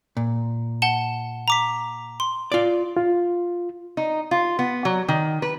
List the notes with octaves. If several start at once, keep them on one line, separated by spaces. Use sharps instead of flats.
A#2
F#5 A5 G7
A#5 D6 B6
C6
F4 D5
F4
D#4
F4
B3
F#3
D#3
B4